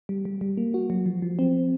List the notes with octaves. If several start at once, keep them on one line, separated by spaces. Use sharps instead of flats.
G3
G3
G3
A#3
F#4
F#3
F3
F3
C4